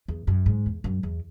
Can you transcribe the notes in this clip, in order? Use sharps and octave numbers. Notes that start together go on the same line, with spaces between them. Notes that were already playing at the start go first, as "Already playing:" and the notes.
E2
F#2
G#2
E2
F#2
E2